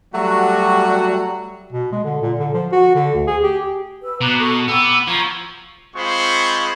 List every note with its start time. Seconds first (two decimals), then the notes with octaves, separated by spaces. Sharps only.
0.14 F#3 G3 A3 F#4
1.73 B2
1.92 G#3
2.04 D3
2.22 A#2
2.39 D3
2.54 F3
2.72 F#4
2.95 D3
3.14 D2
3.27 G#4
3.43 G4
4.03 B4 E6
4.21 B2 A#5 D6 F#6
4.40 A4 A#5 C#6
4.68 B3 G5 D6 E6
5.08 F3 A#5 C#6 G#6
5.96 G#3 C4 F4 C5 B5 C#6